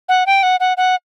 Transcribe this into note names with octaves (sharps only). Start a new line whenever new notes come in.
F#5
G5
F#5
F#5
F#5